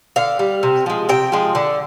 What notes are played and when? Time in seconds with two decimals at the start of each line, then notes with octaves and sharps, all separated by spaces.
0.16 D3 F5
0.39 G3
0.63 C3
0.86 F3 G#3
1.09 C3 G5
1.32 F3 G#3
1.55 D3